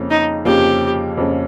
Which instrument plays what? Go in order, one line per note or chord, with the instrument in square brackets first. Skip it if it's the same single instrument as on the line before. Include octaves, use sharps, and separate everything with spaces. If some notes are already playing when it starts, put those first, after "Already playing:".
Already playing: [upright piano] F2 C#3 F3 A#3 C#4
[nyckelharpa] D#4
[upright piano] F2 C#3 F3 A#3 C#4 [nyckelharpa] G4
[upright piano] F2 C#3 F3 A#3 C#4